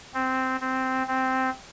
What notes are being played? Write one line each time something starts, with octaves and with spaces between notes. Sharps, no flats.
C4
C4
C4